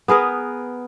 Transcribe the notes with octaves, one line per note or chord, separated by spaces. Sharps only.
B3 G#4 A#4 B4